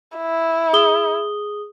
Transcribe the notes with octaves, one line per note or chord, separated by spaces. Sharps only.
E4
G#4 D#6 G7